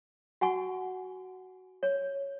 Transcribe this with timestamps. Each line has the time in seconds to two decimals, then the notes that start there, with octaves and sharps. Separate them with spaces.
0.41 F#4 F#5 G#5 C#6
1.83 C#5